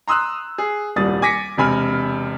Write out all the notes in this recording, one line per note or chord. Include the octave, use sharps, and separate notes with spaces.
A#5 C6 D#6 E6 F#6
G#4
D#1 C2 G3 D#6 A6
G#5 D6 A#6 B6 C#7
E1 C3 G#5 B5 F6